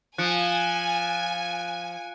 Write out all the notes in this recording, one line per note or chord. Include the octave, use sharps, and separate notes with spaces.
F3 G#5 F#6 C#7 D7